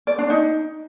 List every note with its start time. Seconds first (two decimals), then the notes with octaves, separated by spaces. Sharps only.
0.07 D5
0.19 D4
0.30 D#4